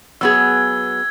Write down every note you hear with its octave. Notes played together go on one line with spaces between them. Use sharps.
F#3 B3 G#4 E6 G#6